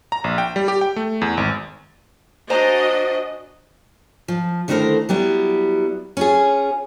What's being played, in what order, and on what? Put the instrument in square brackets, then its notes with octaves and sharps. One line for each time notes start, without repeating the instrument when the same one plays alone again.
[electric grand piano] A#5
A#1
G5
G3
G4
G5
A3
E2
G#1
[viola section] D4 F#4 D#5 [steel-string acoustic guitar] C5 G#5 A#5
[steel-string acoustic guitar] F3
D3 D#3 A3 E4 A#4 C5
F#3 G3 B3 E4
C#4 F4 G#4